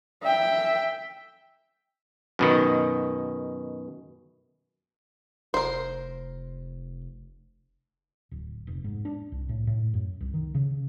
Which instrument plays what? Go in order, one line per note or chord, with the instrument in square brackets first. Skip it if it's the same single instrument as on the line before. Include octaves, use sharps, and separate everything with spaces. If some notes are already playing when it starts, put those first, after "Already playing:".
[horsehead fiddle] E5 G5
[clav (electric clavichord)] F#2 B2 D#3
[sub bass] F1 [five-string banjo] A#4 C5
[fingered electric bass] D1
F1
G#2
D4
C2
A2
A2
F#2
C2
D#3
C#3